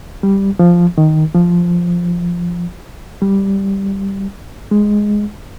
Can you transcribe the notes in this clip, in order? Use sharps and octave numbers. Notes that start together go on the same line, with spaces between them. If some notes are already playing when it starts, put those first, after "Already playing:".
G3
F3
D#3
F3
G3
G#3